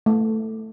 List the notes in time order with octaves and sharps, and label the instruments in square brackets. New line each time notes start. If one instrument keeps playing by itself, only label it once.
[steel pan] A3